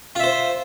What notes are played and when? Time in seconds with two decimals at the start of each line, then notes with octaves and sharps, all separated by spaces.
0.15 F4
0.19 E5
0.24 C5